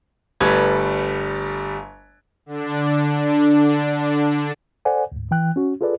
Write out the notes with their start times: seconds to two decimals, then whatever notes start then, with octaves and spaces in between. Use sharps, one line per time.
0.41 G1 G3 A3 B4 G#6
2.46 D3 D4
4.85 A4 C5 D5 F#5 G#5
5.12 D2 G#2
5.31 E3 G5 F#6
5.56 C#4 F#4
5.81 F4 G#4 A4 B4 D5